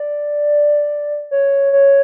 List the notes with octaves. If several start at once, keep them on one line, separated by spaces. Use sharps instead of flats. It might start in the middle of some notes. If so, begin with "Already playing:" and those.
Already playing: D5
C#5
C#5